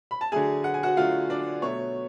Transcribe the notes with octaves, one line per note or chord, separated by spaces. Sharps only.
B5
A5
D3 F#3 A3 G#4 G#5
F#5
G#5
F#4 F#5
D3 F#3 A3 F4 F5
D4 D5
B2 F#3 A3 C#5